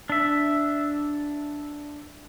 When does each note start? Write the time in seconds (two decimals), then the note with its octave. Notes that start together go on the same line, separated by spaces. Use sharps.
0.10 D4 E5